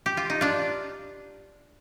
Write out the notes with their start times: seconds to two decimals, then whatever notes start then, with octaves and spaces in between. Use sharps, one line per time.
0.06 G4
0.17 F4
0.30 D#4
0.41 D4 F4